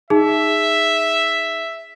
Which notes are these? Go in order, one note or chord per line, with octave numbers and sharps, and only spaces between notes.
D#4 G#4 E5